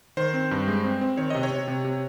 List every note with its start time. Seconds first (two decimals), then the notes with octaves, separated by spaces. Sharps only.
0.17 D#3 C5
0.34 C4
0.51 G2
0.68 G#3
0.84 C4
1.01 C4
1.17 D#3 C#5
1.30 C3 D#5
1.43 C#5
1.51 C3
1.68 C3
1.84 C3